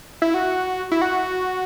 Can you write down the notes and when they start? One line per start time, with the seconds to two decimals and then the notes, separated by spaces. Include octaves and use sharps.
0.22 E4
0.34 F#4
0.91 E4
1.02 F#4